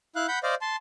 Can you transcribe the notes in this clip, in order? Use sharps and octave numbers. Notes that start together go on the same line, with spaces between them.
E4 F5 F#6
F#5 B5 G6
C5 D5 D#5 F5
A5 C6